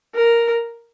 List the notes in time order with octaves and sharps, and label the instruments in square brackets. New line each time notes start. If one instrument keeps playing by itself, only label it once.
[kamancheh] A#4